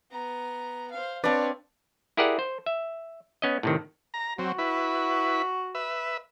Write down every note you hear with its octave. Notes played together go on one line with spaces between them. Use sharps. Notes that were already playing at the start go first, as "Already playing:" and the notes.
B3 A#5
C5 F5
C4 D4 B4 C#5 D5 F5 A5
E4 G4 G#4 A#4 D5 F#5
C5
E5
B3 C#4 D#5
A2 C3 D#3
A#5
F#3 C4 F#4
E4 B4
B4 E5